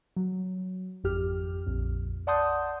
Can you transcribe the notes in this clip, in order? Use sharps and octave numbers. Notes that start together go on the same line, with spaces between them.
F#3
G#1 F2 G4 F6
A#1 F2
D5 F#5 A5 C6 D#6 G6